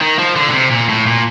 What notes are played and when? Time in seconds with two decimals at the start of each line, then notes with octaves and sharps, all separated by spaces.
0.01 D#3
0.19 F3
0.36 D3
0.49 A#2
0.53 C3
0.71 A#2
0.89 A2
1.07 A#2